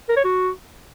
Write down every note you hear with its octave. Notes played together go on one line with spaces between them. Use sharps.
A#4
C#5
F#4